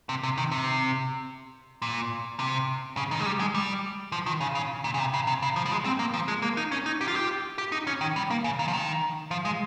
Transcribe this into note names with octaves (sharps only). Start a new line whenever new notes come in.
C3
C3
D#3
C3
A#2
C3
C#3
D#3
G#3
G3
G#3
G3
F3
D#3
C#3
C#3
A#2
C#3
C3
C#3
C3
C#3
F3
G3
G#3
C4
A#3
F3
G#3
A#3
D#4
C#4
D#4
G4
F4
G4
G4
D#4
C#4
D#3
G3
A#3
C#3
D#3
F3
D#3
F3
G#3